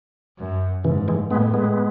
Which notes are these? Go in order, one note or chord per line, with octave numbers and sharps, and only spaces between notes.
F#2
G#2 C#3 E3
E3 G#3
A2 G#3 B3
G#3 B3